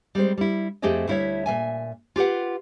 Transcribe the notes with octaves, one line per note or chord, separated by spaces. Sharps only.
G3 G#3 C4 C5
G3 E4
F2 A3 C4 G4 G#4 D#5
D2 G3 E4 F4 C#5 E5
A#2 E3 E5 G#5
F4 G4 B4 F#5